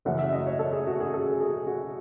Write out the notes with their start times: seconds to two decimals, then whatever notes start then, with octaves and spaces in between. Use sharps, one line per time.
0.05 F#2 C#3 E3 A3 F#5
0.19 E5
0.33 D#5
0.47 C#5
0.59 A4
0.73 G#4
0.87 F#4
1.00 G#4
1.13 A4
1.40 G#4
1.67 F#4